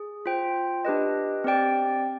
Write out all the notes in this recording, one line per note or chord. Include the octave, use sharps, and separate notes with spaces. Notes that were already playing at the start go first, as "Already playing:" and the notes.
Already playing: G#4
F4 C5 G5
D4 G4 B4 D#5
C4 G4 D5 G5